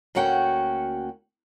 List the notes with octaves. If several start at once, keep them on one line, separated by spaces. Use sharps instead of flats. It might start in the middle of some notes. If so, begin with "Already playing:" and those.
D2 A#3 C#4 F#4 F#5 G5